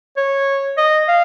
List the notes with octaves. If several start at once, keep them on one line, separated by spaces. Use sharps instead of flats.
C#5
D#5
F5